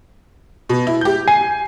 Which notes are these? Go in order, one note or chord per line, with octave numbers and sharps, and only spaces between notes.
B2
E4
G4 G6
G#5 C7